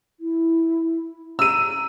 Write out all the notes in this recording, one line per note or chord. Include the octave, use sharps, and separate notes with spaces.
E4
A#5 E6 D#7